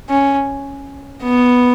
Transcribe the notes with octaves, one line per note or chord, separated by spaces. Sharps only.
C#4
B3